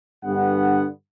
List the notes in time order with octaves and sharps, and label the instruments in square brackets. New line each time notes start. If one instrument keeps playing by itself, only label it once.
[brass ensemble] G2 D3 B3 F#5